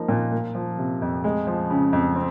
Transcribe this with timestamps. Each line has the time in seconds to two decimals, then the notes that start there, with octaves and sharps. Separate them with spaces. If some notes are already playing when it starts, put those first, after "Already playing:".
Already playing: F3 A#3 D#4
0.09 A#2
0.31 A#3
0.55 F3
0.78 C3
1.02 F2
1.24 G#3
1.47 F3
1.70 C#3
1.93 F2
2.15 C4